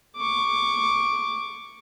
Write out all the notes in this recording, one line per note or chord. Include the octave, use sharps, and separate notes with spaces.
C#6 D6